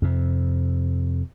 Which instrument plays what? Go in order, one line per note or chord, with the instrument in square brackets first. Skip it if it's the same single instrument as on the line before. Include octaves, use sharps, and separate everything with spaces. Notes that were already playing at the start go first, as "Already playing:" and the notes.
[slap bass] F2 C3